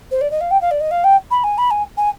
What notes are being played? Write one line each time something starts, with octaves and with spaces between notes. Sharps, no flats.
C5
D5
D#5
F5
G5
F5
D5
D#5
F5
G5
B5
G#5
B5
G#5
G#5